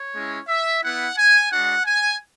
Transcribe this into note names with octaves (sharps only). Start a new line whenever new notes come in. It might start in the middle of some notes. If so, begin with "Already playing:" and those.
Already playing: C#5
G#3 C#4 E4
E5
B3 E4 F#5
G#5
G#3 D4 F#4 F#5
G#5